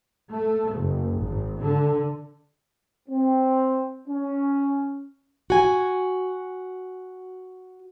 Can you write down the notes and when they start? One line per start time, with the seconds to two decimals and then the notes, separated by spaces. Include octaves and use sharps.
0.30 A3
0.73 F#1
1.17 G#1
1.60 D3
3.09 C4
4.08 C#4
5.50 F#4 G#5